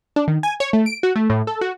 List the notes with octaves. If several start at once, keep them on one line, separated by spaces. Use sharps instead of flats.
D4
D#3
G#5
C#5
A3
D7
F#4
A3
A2
A4
F#4